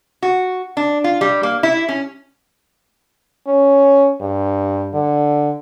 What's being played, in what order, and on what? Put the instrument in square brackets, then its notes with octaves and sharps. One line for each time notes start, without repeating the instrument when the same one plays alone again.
[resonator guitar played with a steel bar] F#4
D4
F4
G3
A#3
E4
C#4
[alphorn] C#4
G2
D3